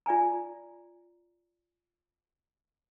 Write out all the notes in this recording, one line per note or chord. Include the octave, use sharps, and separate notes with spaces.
F4 D5 G#5 A#5